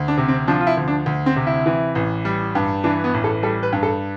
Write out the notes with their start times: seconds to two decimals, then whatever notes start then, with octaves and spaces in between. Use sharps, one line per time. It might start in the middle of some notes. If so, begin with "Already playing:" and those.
Already playing: D2
0.08 D4
0.17 C3
0.28 C4
0.48 F3 D4
0.61 F4
0.67 E4
0.77 D2
0.88 D4
1.06 D2
1.26 C4
1.36 C3
1.47 E4
1.66 E3
1.95 A1
2.25 G3
2.55 G2
2.84 E3 D4
3.04 B3
3.14 A1
3.24 A4
3.43 G3 A4
3.63 B4
3.73 G2
3.83 A4